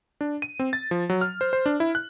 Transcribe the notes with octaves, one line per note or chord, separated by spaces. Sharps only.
D4
D#7
C4
A6
F3
F#3
F6
C5
C5
D4
E4
F#6